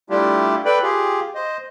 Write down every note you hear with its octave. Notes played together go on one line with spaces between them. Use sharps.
G3 A3 D4 E4 F4 G4
A4 B4 D5 G5 B5
F4 G4 G#4
C5 D#5